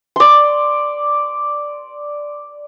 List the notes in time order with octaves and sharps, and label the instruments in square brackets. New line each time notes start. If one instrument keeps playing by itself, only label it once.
[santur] D5 C6